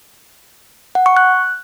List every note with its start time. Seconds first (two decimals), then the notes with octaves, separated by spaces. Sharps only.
0.95 F#5
1.06 C#6
1.17 F#6